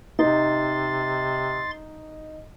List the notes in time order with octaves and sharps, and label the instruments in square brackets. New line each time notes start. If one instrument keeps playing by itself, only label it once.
[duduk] C3 [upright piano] D#4 [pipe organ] C6 A6